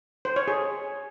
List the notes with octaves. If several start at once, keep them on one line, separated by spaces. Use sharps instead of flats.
C5
C#5
G#4